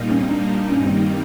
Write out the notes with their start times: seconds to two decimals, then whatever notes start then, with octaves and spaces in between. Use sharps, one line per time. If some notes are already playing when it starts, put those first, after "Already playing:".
Already playing: A#2 G3 A#3 D#4
0.11 C#4
0.21 C4
0.31 D4
0.72 G2 D#3 G3 A#3 C#4 D#4
0.86 C4